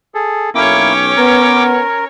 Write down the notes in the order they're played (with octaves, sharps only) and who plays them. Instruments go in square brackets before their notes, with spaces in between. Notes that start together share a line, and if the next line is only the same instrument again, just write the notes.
[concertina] G#4 A4
[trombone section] B1 [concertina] A#3 E4 [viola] C#4 C#5 [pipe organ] G5 D6
[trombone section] B3 [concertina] A#4